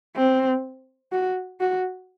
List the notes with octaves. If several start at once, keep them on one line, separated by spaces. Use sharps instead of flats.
C4
F#4
F#4